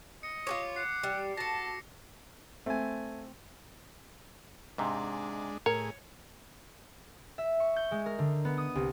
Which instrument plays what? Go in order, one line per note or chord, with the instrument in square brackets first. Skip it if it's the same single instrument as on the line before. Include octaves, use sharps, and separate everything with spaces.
[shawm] D#5 [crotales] C#7
[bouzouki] F4 G#4 C#5 [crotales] D6
[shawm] F#5 [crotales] C7
[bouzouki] G3
[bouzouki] F#4 A4 [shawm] A5 [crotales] A#6 C#7
[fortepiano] A3 G#5 [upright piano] C4
[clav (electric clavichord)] G#2 C3 [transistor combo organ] G#3 D4
[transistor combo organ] A2 G#4 [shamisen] A#4 [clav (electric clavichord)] C#5
[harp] E5
C#6
G6
G#3
A#4
D3
B3
D#6
C2